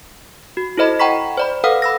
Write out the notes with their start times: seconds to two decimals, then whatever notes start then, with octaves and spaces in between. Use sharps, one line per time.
0.57 F#4
0.78 E4 A4 C5 D#5 B5
0.99 F#5 G5 A#5 B5 C#6 B6
1.38 C5 D5 B5
1.64 A4 B4 F5 F#5 D#6 F6
1.82 B5 E6 A#6